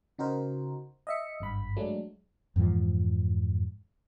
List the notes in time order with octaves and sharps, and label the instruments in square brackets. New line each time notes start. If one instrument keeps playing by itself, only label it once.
[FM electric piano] C#3 D#4 F#4 A#4 C5
D#5 E5 C#7
G#1 G2 B5
F#3 G#3 A3 D4
[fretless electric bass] F2 G#2 E3 F3